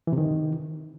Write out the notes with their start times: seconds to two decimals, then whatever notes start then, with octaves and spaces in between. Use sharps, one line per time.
0.07 E3
0.13 C3
0.18 D#3